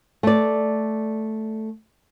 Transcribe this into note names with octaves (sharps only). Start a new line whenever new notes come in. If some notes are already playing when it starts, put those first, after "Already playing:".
A3 D5